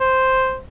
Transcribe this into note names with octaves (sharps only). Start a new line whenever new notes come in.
C5